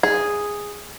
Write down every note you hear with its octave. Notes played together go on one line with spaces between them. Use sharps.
G#4